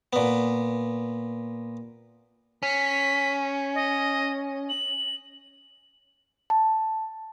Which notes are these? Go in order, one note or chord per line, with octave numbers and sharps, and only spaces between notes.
A#2 B3
C#4 B6
D#5
F#7
A5